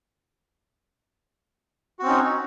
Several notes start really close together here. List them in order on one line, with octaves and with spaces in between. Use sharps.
F#4 C4 C#4 D#4